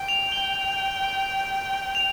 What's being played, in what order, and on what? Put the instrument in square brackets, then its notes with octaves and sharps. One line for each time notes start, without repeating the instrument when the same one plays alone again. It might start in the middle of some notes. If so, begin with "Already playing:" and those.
Already playing: [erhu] G5
[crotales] F7
G7
F7